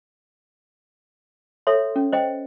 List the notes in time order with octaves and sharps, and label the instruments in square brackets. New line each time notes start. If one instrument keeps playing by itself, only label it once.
[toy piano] A4 C#5 E5 C6
C#4
C5 D#5 G5